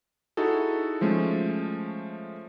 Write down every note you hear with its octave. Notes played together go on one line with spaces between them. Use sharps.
D#4 E4 F#4 G#4 A4
F3 G#3 A3 C#4